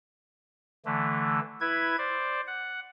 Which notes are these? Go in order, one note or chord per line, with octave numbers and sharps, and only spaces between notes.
D3 E3 A3
E4 B4 G#6
C5 D5
F#5